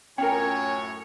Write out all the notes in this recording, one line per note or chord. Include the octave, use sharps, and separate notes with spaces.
F#2 A2 C#4 F4 A#4 C#5 G5 G#5